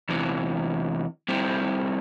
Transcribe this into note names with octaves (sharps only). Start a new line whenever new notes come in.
E2 C3 E3
G3 C4 E4 A4